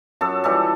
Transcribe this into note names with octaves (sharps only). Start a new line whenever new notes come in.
F#2 A4
E3 G3 A4